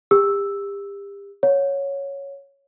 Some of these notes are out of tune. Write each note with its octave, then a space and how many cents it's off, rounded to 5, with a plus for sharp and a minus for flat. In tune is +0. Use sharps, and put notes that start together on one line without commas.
G4 +35 E6 +0
C#5 +0 F#5 -45